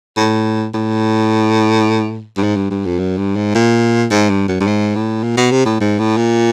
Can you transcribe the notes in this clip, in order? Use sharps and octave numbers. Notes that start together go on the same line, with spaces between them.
A2
A2
G2
G#2
G2
G2
F2
F#2
G2
G#2
A#2
G#2
G2
F#2
G2
G#2
A2
A#2
B2
C3
A2
G#2
A2
A#2